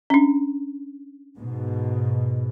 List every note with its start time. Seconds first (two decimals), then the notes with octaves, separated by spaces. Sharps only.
0.10 C#4 D4
1.38 G#2 B2